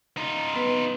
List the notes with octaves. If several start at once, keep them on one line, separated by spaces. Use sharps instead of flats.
D#4 F4
B3 B4